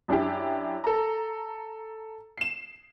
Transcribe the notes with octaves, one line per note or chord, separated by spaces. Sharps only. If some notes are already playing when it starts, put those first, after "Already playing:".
F#2 D4 E4 G4
A4 A#5
C7 E7